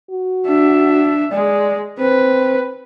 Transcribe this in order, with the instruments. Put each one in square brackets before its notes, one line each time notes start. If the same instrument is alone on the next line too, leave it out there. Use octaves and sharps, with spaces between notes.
[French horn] F#4
[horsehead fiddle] D4 E5
[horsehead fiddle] G#3 [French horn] D5
[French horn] C4 [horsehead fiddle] B4